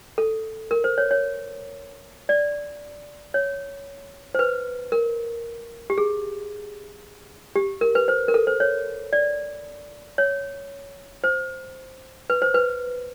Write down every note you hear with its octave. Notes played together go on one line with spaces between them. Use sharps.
A4
A#4
C5
C#5
C#5
D5
C#5
C5
B4
A#4
G4
G#4
G4
A#4
B4
C5
A#4
A4
C5
C#5
D5
C#5
C5
B4
C5
B4